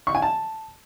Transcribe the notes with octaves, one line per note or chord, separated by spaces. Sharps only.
C#6
G#5
A5